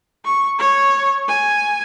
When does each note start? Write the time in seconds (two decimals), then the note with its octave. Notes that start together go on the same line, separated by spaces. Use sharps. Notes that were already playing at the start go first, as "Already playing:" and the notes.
0.25 C#6
0.59 C#5
1.28 G#5